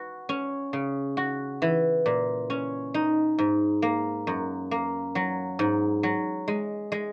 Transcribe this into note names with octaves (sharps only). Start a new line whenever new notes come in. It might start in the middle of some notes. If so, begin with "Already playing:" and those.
Already playing: F#4 B4
C#4
C#3
F#4
E3
A#2
C#4
D#4
G#2
A#3
F#2
A#3
F#3
G#2
F#3
G#3
G#3